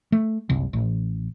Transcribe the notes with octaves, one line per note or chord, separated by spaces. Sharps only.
A3
F#1 C2
A1